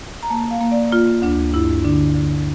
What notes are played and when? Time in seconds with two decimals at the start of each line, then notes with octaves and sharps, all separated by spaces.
0.23 A#5
0.30 A#3 A5
0.51 F5
0.61 A#3
0.71 D5
0.91 A#3 F4
1.22 D2 D4
1.53 G2 E4
1.85 D3 D4
2.15 D3